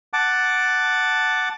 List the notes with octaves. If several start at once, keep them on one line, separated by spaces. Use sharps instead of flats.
F#5 A5 D6